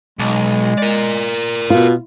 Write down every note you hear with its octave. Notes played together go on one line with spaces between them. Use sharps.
B1 G#3
A#4 D5
B2 F4